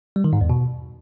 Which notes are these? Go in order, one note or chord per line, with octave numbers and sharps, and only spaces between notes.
G3
D#3
G#2
E2
B2